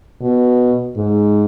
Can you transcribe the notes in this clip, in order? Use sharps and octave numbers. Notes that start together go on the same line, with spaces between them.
B2
G#2